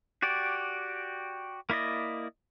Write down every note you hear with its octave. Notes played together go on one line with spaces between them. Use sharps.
F#4 G4 D5
A#3 E4 D5 D#5